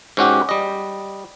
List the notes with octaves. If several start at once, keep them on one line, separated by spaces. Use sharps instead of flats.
G#2 C#4 F#4 G4
G3 D#5